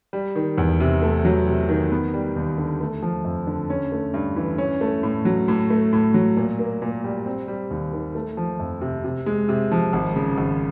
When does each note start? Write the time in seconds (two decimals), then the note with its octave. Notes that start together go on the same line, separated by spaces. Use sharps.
0.13 G3
0.35 D#3
0.58 E2
0.80 C3
1.02 A3
1.25 F#3
1.47 C3
1.69 D#3
1.91 B3
2.14 G3
2.36 D#2
2.58 D3
2.81 A3
3.02 F3
3.25 F2
3.47 D3
3.70 C#4
3.92 A3
4.14 G2
4.36 E3
4.58 C#4
4.81 A3
5.03 A2
5.25 F#3
5.48 A2
5.70 A3
5.93 A2
6.14 F#3
6.37 A#2
6.59 A#3
6.82 A#2
7.04 G3
7.26 C4
7.48 G3
7.71 D#2
7.93 D#3
8.15 A3
8.37 F3
8.60 F2
8.81 C3
9.04 C3
9.26 G#3
9.49 C3
9.71 F3
9.93 G#1
10.16 C#3
10.38 G#1